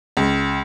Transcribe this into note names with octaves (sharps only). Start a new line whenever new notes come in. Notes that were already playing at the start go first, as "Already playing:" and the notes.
C#2